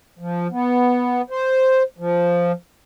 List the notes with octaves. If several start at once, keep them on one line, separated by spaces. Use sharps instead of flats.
F3
B3
C5
F3